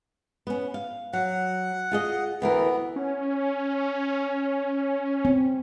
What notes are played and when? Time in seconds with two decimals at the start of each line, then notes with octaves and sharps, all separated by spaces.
0.47 B3 C#4
0.74 F5
1.13 F#3 F#5
1.92 F4 G#4 D#5
2.42 D2 E3 B3 A#4
2.96 C#4
5.25 C4